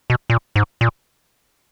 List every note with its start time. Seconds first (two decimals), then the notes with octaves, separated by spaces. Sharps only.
0.10 B2
0.30 A#2
0.56 G#2
0.81 A#2